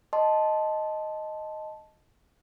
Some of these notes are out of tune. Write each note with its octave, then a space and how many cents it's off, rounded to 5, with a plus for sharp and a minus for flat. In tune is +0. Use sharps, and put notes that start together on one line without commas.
D#5 +0 A5 -10 C6 +0